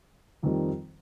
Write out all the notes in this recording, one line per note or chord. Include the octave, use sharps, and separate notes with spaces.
F2 D#3 G3 C4 D#4